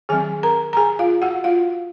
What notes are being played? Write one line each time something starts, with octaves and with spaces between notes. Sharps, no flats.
D#3 F#3 C4 G#4 G#5
A#4 A#5
A#5
G#4 G#5
F4 F5
F#4 F#5
F4 F5